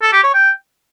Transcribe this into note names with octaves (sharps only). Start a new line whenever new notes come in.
A4
G4
C#5
G5